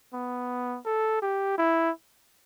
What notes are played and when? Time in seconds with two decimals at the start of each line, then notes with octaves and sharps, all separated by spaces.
0.13 B3
0.85 A4
1.22 G4
1.58 E4